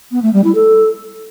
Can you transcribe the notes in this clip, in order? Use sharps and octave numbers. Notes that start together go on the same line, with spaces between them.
B3
A3
G3
E4
A4